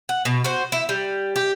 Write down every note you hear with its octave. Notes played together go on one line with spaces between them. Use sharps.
F#5
B2
F#4 C5
E4
G3
G4